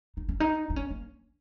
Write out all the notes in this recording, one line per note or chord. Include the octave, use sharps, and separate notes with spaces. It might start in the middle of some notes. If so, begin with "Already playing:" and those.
D#4
C#4
D#4
D#4
C#4
A#3